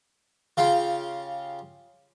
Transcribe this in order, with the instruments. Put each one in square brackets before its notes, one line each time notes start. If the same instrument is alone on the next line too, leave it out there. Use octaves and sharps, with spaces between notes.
[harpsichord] C#3 F4 G4 F5 G5 C6